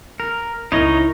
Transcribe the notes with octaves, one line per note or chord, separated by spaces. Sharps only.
A#4
C#2 D#4 E4 A#4 C#5 D#5